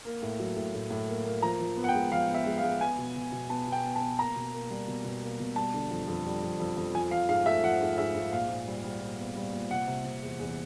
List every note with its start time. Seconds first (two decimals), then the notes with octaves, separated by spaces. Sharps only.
0.05 A#3
0.22 A2
0.39 F#3
0.56 A2
0.74 A2
0.90 A2
1.08 A#3
1.25 A#3
1.42 F3 A#5
1.60 F3
1.77 B3
1.84 F#5
1.89 G5
1.94 G#3
2.12 F3 F5
2.29 B3
2.34 E5
2.46 G#3
2.58 F5
2.63 G#3
2.80 B3 G#5
2.98 B2
3.15 B2
3.32 B2
3.50 B3 A5
3.67 B2
3.72 G5
3.84 B3
3.96 A5
4.01 B3
4.19 A#3 A#5
4.36 B2
4.53 A#3
4.70 G3
4.88 B2
5.04 B2
5.22 A#3
5.40 B2
5.56 G3 A5
5.74 D3
5.91 F2
6.08 F2
6.25 G3
6.43 F2
6.60 F2
6.77 F2
6.95 F3 G#5
7.11 F3 F5
7.29 G#2 F5
7.46 A3 E5
7.64 F3 F#5
7.81 G#2
7.98 G#2 E5
8.15 G#2
8.32 A#2 F5
8.49 A#2
8.67 G3
8.84 G3
9.01 A#2
9.19 B3
9.36 G3
9.53 A#2
9.70 C3 F#5
9.87 C3
10.04 C3
10.22 E2
10.39 E2